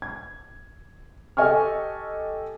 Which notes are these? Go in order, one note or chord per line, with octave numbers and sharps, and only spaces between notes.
G#6
G4 A4 D#5 G#5 C#6 F6